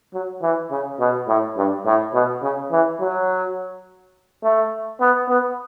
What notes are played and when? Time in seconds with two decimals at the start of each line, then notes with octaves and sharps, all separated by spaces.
0.14 F#3
0.42 E3
0.71 C#3
1.00 B2
1.28 A2
1.57 G2
1.86 A2
2.14 B2
2.43 C#3
2.72 E3
3.01 F#3
4.44 A3
5.01 B3
5.29 B3